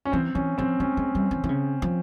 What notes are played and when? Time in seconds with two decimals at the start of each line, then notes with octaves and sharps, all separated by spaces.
0.05 C#4
0.12 E3 C4
0.35 E3 C#4
0.58 F3 C4
0.80 G#3 C#4
0.97 G#3
1.15 G3
1.31 E3
1.44 E3
1.49 C#3
1.82 F3